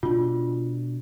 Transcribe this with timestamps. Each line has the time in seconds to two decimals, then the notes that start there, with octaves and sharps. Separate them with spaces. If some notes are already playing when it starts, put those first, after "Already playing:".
0.03 B2 D4 F4